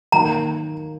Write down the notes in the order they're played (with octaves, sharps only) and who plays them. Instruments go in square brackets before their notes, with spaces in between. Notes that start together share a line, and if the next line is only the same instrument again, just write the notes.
[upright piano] D#3 F#3 A#3 [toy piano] A#5